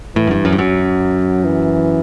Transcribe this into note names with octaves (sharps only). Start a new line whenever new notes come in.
A2 E3
F#2
G2
F#2
G2
F#2 F#3
E3